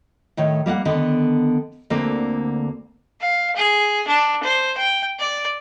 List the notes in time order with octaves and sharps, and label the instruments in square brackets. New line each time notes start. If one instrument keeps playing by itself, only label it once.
[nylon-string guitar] A2 D#3 C#5
G3 A#3 F5 F#5
D3 D#3 B3
D2 D3 A#3 C4
[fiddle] F5
G#4
D4
C5
G5
D5